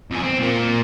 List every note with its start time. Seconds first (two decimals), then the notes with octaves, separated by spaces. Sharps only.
0.11 F2 G#4
0.23 C4
0.39 A#2 A#3